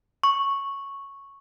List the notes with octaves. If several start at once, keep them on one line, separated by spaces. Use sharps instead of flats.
C#6